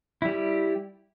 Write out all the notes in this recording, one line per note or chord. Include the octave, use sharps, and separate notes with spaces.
G3 E4 G4